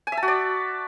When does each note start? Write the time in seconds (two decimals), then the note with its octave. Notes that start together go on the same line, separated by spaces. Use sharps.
0.07 G#5
0.12 E5
0.17 A5
0.23 F#4
0.28 D5